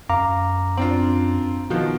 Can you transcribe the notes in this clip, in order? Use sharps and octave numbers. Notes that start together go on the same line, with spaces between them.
F#2 F5 A#5 D6
C4 D4 F4
B2 D#3 F3